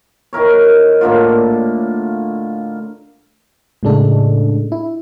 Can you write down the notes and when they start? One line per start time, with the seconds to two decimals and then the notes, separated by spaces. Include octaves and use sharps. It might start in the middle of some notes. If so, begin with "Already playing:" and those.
0.33 D#3 E4 A#4 C#5
1.01 A2 D3 A#3 F4
3.83 A2 C#3 G#3 D4 A4
4.72 E4